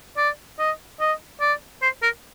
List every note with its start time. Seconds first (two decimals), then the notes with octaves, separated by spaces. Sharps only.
0.17 D5
0.59 D#5
1.00 D#5
1.41 D5
1.82 C5
2.03 A#4